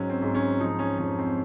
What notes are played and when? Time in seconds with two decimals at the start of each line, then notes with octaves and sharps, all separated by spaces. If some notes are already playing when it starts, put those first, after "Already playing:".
Already playing: G#2 F#3 C#4
0.09 C4
0.22 G#2
0.35 C#4
0.60 F3 D#4
0.79 C#4
0.98 F2 C#4
1.18 C4